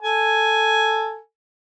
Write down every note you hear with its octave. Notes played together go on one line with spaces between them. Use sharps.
A4 G#5